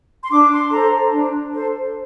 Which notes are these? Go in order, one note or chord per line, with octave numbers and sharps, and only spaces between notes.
C6
D4 D6
C6
A4 C5 A#5
D4
A4 C5